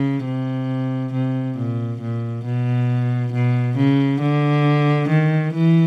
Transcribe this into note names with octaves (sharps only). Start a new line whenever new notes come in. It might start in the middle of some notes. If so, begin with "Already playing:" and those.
Already playing: C#3
C3
C3
A#2
A#2
B2
B2
C#3
D3
D#3
E3